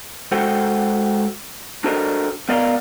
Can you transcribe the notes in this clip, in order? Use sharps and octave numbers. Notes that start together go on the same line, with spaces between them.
G#3 F#4 A4 C5 F#5 G5
D4 F#4 A4 A#4 C5 D#5
B3 A#4 D5 D#5 F5 A#5